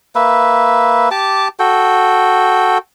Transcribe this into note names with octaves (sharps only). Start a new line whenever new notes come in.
A#3 B4 E5
G4 A5 D6
F#4 A4 G5